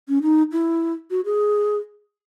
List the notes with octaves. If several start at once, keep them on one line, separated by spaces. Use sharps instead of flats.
C#4
D#4
E4
F#4
G#4